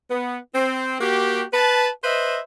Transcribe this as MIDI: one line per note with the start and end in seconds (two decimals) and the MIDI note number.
0.10 0.38 59
0.55 0.97 60
1.00 1.43 58
1.00 1.43 66
1.00 1.43 67
1.52 1.89 71
1.52 1.89 81
2.03 2.38 71
2.03 2.38 72
2.03 2.38 75
2.03 2.38 76